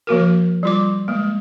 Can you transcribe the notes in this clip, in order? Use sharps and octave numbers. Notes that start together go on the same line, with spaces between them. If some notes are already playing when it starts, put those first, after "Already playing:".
F3 A#3 F#4 A#4
G3 F4 D6
G#3 A#3